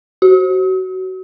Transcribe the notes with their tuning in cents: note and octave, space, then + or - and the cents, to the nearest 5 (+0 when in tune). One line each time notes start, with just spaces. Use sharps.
F#4 +20